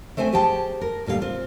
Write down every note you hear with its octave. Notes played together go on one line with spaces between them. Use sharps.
A3 C4 C5 E5 G#5
G4 G#4 C5 G5 A5
A#4
D2 A#2 G3 A4 F5
C4 F4